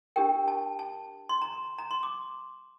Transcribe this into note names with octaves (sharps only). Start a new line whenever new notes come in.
D4 G4 A#4 G5
A5
A5
C6
A#5
A#5
C6
D6